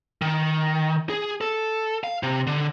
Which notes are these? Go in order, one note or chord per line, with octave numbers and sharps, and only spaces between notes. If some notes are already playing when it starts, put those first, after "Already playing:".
D#3
G#4
A4
F5
C3
D3